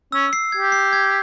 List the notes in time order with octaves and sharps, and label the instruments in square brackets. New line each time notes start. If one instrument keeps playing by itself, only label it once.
[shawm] C#4 [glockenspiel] E6
[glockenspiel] C7
[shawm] G4 [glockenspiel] G#6
[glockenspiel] C7
G#6